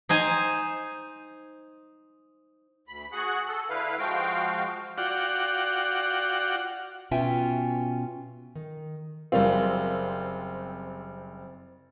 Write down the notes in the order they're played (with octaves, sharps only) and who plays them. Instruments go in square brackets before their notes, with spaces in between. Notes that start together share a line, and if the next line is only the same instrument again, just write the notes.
[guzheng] D#4 C5 G#5
[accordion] D2 B5
F#4 G#4 F#5 F#6
A4
D3 E4 B4 F5
F3 G#3 F#4 F5 G5
[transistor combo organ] F4 F#4 D5 F#5 G5
[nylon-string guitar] B2 C#4 F4 E5 G5 G#5
D#3
[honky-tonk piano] F#1 G3 C4 [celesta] A#4 D5 F5